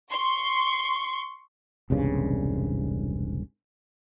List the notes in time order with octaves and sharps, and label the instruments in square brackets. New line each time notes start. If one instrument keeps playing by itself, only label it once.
[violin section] C6 C#6
[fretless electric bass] E1 C2 G2 C#3